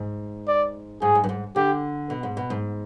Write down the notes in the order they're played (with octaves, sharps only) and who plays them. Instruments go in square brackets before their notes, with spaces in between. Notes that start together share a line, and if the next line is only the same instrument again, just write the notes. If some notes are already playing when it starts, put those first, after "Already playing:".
Already playing: [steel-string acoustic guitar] G#2
[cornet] D5
[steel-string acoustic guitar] G#2 [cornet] G#4
[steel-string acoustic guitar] G#2
G2
G#2
[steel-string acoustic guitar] D3 [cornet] G4
[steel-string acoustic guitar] B2
G#2
B2
G#2